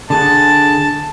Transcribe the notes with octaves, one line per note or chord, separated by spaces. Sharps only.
D3 G#4 F#5 A5